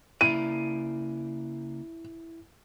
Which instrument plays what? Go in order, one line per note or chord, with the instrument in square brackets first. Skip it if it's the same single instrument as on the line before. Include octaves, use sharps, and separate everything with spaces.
[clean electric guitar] C#3 A#3 D5 [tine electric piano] E4 [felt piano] D#7